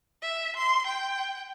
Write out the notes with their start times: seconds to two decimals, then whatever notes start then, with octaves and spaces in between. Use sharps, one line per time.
0.22 E5
0.56 C6
0.87 G5